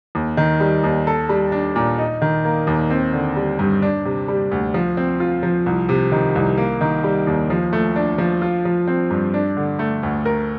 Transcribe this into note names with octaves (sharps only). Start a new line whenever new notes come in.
D#2
D#3
G3
D#2
A4
G3
D4
A#2
D#4
D#3
A#3
D#2
C4
D3
G3
G2
D4
C3
G3
D2
F3
C4
F4
F3
C2
C3
D#3
C2
A#3
D#3
G3
D#2
F3
A3
D4
F3
F4
F3
C4
G2
D4
D3
A3
D2
A#4